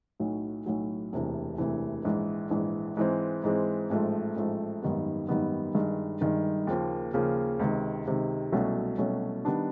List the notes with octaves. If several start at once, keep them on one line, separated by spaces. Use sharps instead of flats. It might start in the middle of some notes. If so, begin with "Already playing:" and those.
B1 A2 F#3
B1 A2 F#3
E1 D2 C3 E3
E1 D2 C3 E3
A#1 G#2 E3
A#1 G#2 E3
G#2 E3 G#3 C4
G#2 E3 G#3 C4
A1 G#2 F3 A3
A1 G#2 F3 A3
G#1 F#2 D#3 G3 B3
G#1 F#2 D#3 G3 B3
G1 G2 D#3 G#3
G1 G2 D#3 G#3
D#2 C#3 F3 A#3
D#2 C#3 F3 A#3
C#2 C3 D#3
C#2 C3 D#3
C2 B2 F#3 A3 C#4
C2 B2 F#3 A3 C#4
D#3 G3 B3 D4